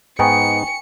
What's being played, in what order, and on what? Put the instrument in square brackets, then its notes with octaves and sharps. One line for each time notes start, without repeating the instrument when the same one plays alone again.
[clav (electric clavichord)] G#2 B3 D#4 [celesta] G5 G#5 C#6 [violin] C#7